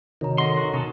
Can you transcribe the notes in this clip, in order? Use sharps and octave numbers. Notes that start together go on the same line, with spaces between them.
C3 D#3 D#4 F#4 A#4 C#5 A#5
C4 A4 D#5 F#5 C6
F#4
B2 C#4 D#4 A4 A#6